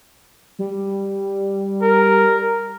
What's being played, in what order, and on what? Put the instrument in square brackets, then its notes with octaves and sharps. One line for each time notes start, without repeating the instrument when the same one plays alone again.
[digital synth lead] G3
[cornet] A#4